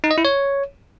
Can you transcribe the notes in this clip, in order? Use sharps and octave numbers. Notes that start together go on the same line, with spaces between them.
D#4
D#5
E4
C#5